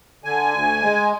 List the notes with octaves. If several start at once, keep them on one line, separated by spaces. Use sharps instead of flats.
D3 G#5
D2
G#3